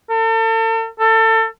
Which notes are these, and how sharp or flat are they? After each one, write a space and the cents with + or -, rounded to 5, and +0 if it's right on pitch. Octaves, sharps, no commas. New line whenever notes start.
A4 +40
A4 +30